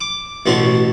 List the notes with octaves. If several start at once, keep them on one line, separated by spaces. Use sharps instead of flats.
D6
A1 B2 A3 C#4 C6